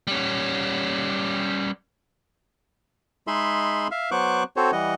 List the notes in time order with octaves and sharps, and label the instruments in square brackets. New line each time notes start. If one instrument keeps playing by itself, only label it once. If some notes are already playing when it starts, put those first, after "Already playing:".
[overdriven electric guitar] G3 C#4
[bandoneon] G#3 D#4 G#4 E5 B5 C6
E5 F5
F#3 B3 C5 C#6 D6 F#6
C4 F#4 A4 C5 C#5
E3 G3 D#5 F#5